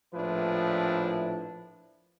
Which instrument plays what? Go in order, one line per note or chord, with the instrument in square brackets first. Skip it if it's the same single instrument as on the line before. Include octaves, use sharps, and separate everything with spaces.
[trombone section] A#1 A2 F3 D4 E4 B4